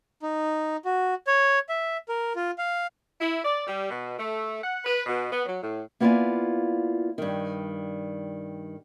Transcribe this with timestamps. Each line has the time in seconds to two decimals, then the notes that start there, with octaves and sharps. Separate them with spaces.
0.22 D#4
0.85 F#4
1.27 C#5
1.69 E5
2.08 A#4
2.36 F4
2.58 F5
3.20 E4
3.44 D5
3.67 G3
3.90 B2
4.18 A3
4.64 F#5
4.84 B4
5.07 B2
5.32 B3
5.46 F#3
5.63 A2
6.00 A#3 B3 E4 F4 D5 G#5
7.18 G2 D#3